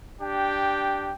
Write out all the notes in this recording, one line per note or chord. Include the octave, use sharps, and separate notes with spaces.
D4 G4 G5